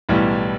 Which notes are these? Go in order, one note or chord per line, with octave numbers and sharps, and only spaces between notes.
B1 A2 E3 G3